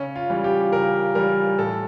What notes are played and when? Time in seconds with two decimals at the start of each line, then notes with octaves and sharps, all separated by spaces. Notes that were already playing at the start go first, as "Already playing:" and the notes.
Already playing: C#3 C#4
0.16 F4
0.30 E3 G3
0.44 G4
0.72 C#3 A#4
1.15 E3 G3 A#4
1.58 A2 A4